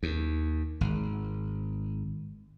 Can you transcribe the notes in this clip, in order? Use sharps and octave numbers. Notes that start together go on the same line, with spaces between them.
D#2
G#1